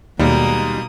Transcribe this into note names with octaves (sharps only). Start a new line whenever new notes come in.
D#2 B2 G3 G#3 A#3 D#4 D#6